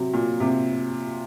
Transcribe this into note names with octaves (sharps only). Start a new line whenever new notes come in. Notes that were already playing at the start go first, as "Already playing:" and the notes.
Already playing: C3 F#3
A#2
C3